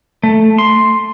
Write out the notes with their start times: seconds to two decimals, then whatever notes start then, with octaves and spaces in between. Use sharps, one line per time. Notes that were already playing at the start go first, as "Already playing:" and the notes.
0.23 A3
0.58 C6